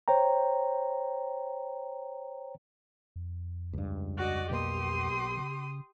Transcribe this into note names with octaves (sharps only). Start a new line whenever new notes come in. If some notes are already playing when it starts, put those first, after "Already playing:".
C5 C#5 G5 A#5
F2
C#2 G2
F#4 D5 D#5
B1 B2 A#3 G4 C6 D#6
C#3